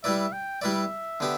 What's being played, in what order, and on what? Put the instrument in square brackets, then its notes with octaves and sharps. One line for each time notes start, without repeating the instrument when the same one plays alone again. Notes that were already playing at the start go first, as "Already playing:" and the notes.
[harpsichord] G3 E4 B4 D5 [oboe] E5
[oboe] G5
[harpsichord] G3 E4 B4 D5 [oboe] E5
[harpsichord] D3 B3 G4